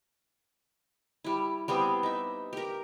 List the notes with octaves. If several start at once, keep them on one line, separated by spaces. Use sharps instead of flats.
G3 E4
G3 B3 C4 G#4
D#4 E5
G4 A#4